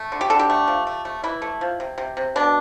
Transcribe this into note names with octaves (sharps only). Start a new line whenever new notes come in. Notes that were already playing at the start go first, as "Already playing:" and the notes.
Already playing: A3
D3
G4
D3 A4
G4
A3
F3
A3
A3
E3 E4
A3
F3
C3
C3
C3
B2 D4